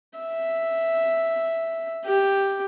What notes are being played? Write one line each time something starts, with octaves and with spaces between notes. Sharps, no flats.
E5
G4